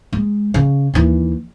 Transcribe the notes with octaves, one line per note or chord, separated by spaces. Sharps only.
G#3
C#3
D#2 E3